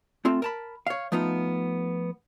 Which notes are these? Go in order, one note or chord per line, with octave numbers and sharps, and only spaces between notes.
A3 C4 F4 A4
A#4 A5 B5
C#5 F5
F3 A3 B3 D#4 F4